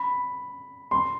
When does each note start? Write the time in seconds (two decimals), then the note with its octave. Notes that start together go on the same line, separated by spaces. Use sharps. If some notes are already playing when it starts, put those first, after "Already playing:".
Already playing: B5
0.91 C6